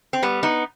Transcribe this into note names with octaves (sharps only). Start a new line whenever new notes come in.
C4
G3 B3
B3 D#4